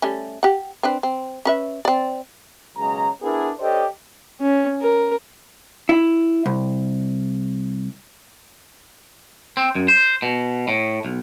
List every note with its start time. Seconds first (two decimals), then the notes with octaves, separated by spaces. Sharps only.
0.02 G3 A3 C#4
0.43 G4 F#5
0.83 C4 D4 B4
1.03 C4
1.45 C#4 B4 E5
1.85 C4 D5
2.77 B1 C#3 G#3 A#5
3.22 B3 D4 E4 G#4 A#4
3.60 D4 G4 A4 C5 C#5 D#5
4.41 C#4
4.81 A#4
5.89 E4
6.46 C2
9.57 C4
9.75 F#2
9.88 C5
10.22 B2
10.68 A2
11.05 B1